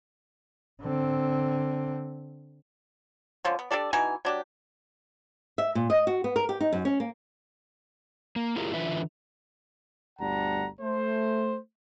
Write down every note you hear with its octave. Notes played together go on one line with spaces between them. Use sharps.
D3 C4
D3 F3 C#4
B3
D4 G4 A4 D5
B2 E3 D#4 G#5
F#3 D4 G4
E5
A#2
D#5
F#4
B3
A#4
G4
D#4
F#2
C#4
A#3
A#3
E4 F4 G4 G#4 A#4
D3 E3 F4 B4 E5
G1 D2 G3 F#5 A5 A#5
A3 C5